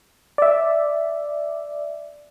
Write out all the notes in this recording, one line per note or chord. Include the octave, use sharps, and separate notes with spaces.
D5 E5